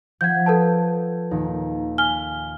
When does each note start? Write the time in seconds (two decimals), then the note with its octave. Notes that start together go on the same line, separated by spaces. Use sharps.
0.21 F3 F#5 G6 G#6 B6
0.46 A4 B4 A5
1.31 D#2 A#2
1.98 G#5 F6 B6 G7